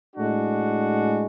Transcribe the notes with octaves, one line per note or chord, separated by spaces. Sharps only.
A2 G#3 D4 F#4